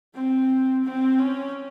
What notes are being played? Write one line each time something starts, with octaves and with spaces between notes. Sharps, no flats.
C4
C4
C#4